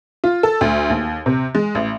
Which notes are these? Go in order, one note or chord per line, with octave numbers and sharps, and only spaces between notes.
F4
A4
D2
D#2
C3
G#3
A1